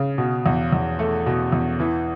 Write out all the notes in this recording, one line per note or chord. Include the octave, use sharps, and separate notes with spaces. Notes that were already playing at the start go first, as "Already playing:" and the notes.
Already playing: C#3
B2
E2
E2
A3
B2
E2
E3